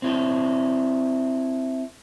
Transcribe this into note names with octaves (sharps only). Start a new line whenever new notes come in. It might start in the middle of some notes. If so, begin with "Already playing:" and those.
C4 E4 A4